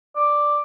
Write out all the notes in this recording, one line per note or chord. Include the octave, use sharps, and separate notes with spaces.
D5